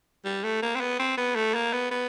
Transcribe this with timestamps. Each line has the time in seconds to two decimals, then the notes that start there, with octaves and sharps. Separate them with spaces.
0.25 G3
0.44 A3
0.62 A#3
0.75 C4
0.80 B3
0.99 C4
1.17 B3
1.36 A3
1.54 A#3
1.73 B3
1.91 B3